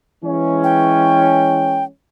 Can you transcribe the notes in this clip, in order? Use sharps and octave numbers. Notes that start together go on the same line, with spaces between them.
E3 G#3 C#4
G5